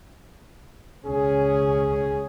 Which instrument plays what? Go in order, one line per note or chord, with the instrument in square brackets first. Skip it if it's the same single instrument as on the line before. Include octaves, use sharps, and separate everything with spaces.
[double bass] C#2 C#4 [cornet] G#4